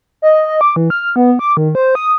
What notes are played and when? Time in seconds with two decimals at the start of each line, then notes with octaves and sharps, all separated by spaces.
0.22 D#5
0.45 D#5
0.61 D6
0.76 E3
0.90 F6
1.16 B3
1.39 D6
1.57 D#3
1.75 C5
1.95 D#6